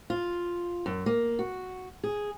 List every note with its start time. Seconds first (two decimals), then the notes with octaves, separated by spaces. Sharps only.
0.10 F4
0.86 F#2
1.06 A#3
1.39 F#4
2.04 G#4